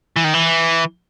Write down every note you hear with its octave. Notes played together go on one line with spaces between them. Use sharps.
E3
D#3
E3